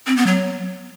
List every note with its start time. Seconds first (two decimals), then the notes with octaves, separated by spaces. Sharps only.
0.07 C4
0.17 B3
0.27 F#3